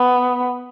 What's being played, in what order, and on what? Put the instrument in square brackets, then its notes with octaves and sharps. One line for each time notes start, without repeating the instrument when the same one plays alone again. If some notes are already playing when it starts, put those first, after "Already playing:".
Already playing: [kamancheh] B3